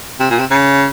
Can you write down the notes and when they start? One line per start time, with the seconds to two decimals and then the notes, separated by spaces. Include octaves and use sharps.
0.20 C3
0.30 A#2
0.39 C3
0.51 C#3